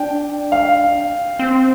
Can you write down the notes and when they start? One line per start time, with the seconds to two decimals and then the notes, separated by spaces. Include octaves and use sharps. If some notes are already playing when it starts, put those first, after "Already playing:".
Already playing: D4 G5
0.52 F5
1.39 C4